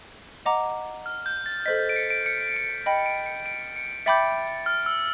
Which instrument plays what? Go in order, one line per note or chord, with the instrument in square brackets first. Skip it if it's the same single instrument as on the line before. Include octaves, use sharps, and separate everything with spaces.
[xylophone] D#5 F#5 A#5 D6
[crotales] F6
G6
A6
[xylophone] A4 C5 D#5 [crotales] B6
[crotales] D7
C#7
D7
C#7
D7
[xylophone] D#5 G5 B5
[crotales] D7
C#7
D7
C#7
[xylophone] E5 G5 B5 D6 G6 [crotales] A6
[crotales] F6
E6